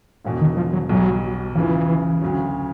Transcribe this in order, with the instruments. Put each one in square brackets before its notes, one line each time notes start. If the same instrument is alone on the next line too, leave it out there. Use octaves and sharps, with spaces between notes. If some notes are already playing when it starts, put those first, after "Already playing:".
[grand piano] E1 E2 B2
[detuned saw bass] D#3
F3
F#3
[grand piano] B1 B2 G3 [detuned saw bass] F#3
[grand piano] E2 C#3 F3 [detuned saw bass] E3
[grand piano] D2 C#3 F#3